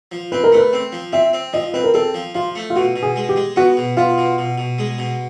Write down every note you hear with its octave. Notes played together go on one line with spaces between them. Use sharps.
F3
C4 B4
A#4
A3 B4
C4
F3
C4 E5
C4
F3 D#5
C4 B4
A#4
C4 A4
F3
F3 F4
A3
F4
B2 F#4
B2
G#4
G#3
G4
G#3
B3 F#4
B2
B3 F4
B2
B2
B2
G#3
B2